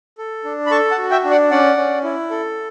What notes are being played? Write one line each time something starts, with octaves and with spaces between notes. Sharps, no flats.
A4
D4
B5
A4 A5 C#6
F#5 A5
F#4
E5 G5
D4
D5 F#5
C#4 D5 F#5
C#4
E4
A4